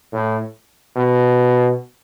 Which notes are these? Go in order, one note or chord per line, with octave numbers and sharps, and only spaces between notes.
A2
B2